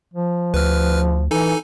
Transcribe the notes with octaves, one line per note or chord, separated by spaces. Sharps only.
F3
D2 B4 F6
E3 D#4 A4 G#5